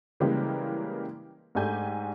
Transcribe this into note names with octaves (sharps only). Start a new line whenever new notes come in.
C#3 E3 G3 G#3 A#3 G4
G#2 A3 D4 G4 G#5 G6